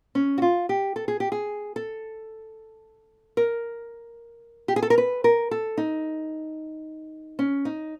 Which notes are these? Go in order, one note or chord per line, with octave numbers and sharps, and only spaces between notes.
C#4
F#4
F4
G4
A4
G#4
G4
G#4
A4
A#4
G4
G#4
A4
A#4
B4
A#4
A4
D#4
C#4
D#4